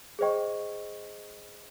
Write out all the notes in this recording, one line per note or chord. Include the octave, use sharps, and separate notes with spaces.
G#4 C5 D#5 G5 C#6